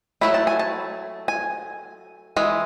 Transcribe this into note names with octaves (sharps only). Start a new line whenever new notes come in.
F#3 A3 E4 B5
A5
G#5
A5
G#5
E3 G#3